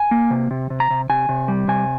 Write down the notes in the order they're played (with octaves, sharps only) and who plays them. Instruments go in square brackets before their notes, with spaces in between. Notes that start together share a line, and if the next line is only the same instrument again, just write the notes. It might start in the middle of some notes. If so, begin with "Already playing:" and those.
Already playing: [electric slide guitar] G#5
A#3
C3
C3
C3
A#5
C3
C3 G#5
C3
G3
C3 G#5